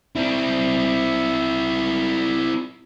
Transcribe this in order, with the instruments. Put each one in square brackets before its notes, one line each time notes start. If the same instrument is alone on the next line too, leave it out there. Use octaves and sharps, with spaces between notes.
[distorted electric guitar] C4 E4